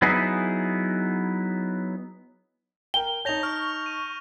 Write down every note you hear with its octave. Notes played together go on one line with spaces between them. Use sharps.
F#3 B3 D#4 E4 G#4
A#4 G5 G7
D#4 C#5 A5 G6 A#6 F7
C#6 F6 A#6 F7
D#7